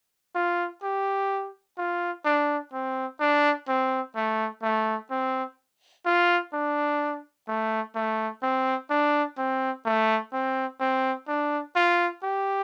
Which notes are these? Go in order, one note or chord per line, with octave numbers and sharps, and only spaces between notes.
F4
G4
F4
D4
C4
D4
C4
A3
A3
C4
F4
D4
A3
A3
C4
D4
C4
A3
C4
C4
D4
F4
G4